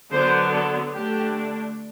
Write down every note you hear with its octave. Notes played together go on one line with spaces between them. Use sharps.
D3 F#3 B3 C5
A4
D3 A3 D4 G4